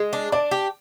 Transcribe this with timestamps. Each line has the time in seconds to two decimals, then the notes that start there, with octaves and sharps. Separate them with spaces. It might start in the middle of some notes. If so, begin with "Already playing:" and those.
Already playing: G#3
0.13 D4
0.32 D4 D5
0.51 G4